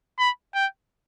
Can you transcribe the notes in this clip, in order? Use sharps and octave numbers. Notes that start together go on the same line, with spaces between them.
B5
G5